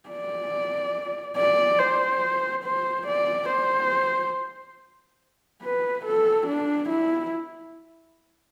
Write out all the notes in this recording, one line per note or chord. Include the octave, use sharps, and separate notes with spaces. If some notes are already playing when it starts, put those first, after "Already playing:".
D5
D5
C5
C5
D5
C5
B4
A4
D4
E4